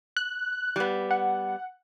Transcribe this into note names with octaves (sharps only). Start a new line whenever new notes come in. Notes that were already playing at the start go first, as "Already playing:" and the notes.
F#6
G3 B3
F#5